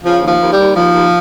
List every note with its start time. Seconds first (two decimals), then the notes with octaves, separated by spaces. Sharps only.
0.04 C#3 F3
0.22 D#2
0.28 F3
0.41 D#2
0.52 D#2 G3
0.76 D#2 F3
0.95 D#2